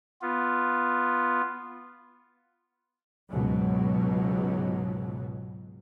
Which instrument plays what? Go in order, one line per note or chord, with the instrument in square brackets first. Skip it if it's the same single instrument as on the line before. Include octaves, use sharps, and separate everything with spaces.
[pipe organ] B3 F4
[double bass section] C#2 G#2 B2 F#3